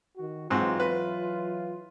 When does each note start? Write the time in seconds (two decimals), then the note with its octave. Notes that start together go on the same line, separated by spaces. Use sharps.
0.17 D#3 F#4
0.50 G#2 E3 F#3 C4 F4 F#4
0.80 B4